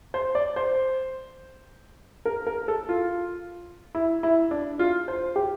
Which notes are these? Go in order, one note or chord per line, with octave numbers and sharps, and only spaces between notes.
C5
D5
C5
A#4
A#4
A4
F4
E4
E4
D4
F4
C5
G4